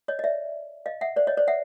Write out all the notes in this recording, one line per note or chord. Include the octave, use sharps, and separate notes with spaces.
C#5 D#5
D#5
D5 E5
D#5 F5
E5 F#5
C5 D5
C#5 D#5
C5 D5
E5 F#5